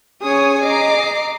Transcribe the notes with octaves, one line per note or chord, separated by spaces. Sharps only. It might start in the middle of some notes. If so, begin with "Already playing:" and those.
C#4 G#4 C#5 D#6
D#5 A#5 D6 C7